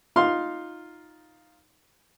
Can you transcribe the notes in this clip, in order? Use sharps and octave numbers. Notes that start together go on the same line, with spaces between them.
D#4 F4 F5 C6